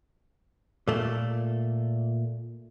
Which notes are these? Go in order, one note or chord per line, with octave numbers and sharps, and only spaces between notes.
A#2 A3